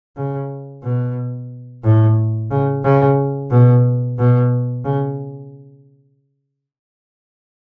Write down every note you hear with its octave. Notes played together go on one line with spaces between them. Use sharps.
C#3
B2
A2
C#3
C#3
B2
B2
C#3